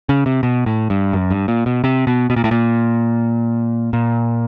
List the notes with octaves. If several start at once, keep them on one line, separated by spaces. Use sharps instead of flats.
C#3
C3
B2
A2
G2
F#2
G2
A#2
B2
C3
B2
B2
A#2
A2
A#2
A#2